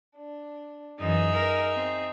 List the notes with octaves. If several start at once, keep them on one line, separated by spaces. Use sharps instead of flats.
D4
F#2 E3 D#4 G#4 E5
A#4
C4